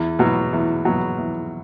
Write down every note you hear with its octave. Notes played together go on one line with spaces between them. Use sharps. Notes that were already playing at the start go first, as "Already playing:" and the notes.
Already playing: E2
B2 F#3
E2
B2 F#3
E2